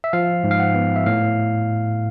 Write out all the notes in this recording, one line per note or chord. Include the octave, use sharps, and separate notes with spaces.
E5
F3 F5
G#2
F5
F#5
B3
E5
A2 F5